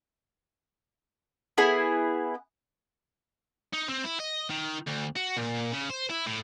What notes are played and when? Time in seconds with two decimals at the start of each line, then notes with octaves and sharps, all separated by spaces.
1.58 B3 E4 G#4 G#5
3.73 D#4
3.89 C4
4.04 E4
4.20 D#5
4.50 D#3
4.87 D2
5.16 F#4
5.37 A#2
5.72 C#3
5.90 C5
6.10 E4
6.26 A2